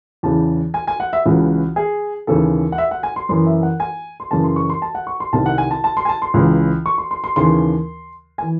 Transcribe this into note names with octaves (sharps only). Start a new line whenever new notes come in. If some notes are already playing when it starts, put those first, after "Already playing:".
E2 C#3 E3 A5
G#5
G#5
F#5
E5
C#2 C#3 E3 F#4
G#4
D#2 C#3 E3 A4
F#5
E5
F#5
G#5
C6
F#2 E3 C6
E5
F#5
G#5
C6
F#2 C#3 E3 A5
C6
C#6
C6
A5
F#5
C#6
C6
C2 C3 D#3 A5
F#5
G#5
A5
A5
C6
G#5
A5
C6
C#2 C#3 E3
C#6
C6
C6
C6
D#2 C#3 E3 C6
G#5
E3